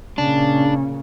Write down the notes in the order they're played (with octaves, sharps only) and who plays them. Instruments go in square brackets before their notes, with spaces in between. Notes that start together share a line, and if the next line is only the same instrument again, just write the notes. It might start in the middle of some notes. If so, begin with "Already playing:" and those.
[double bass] A#2 C#3 [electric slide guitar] D4